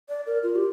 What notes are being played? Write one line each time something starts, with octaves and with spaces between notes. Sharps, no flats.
D5
A#4
F4
G4